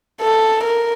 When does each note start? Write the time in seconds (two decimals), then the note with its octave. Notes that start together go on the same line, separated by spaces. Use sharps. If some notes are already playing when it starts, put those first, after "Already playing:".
0.21 A4
0.64 A#4